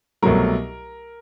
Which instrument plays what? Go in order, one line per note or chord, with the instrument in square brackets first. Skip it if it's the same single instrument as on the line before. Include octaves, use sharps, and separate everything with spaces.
[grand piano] C2 B2 F#3 A3 A#4